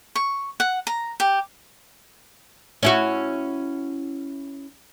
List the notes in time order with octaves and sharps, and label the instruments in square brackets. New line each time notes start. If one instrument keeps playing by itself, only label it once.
[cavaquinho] C#6
F#5
A#5
G4
[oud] C#4 E4 F#4